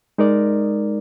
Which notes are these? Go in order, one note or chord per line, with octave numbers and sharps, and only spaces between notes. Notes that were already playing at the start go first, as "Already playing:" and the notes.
G#3 D#4 A#4 D5